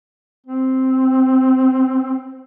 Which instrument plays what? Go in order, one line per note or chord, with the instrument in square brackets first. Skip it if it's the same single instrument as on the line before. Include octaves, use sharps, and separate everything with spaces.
[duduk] C4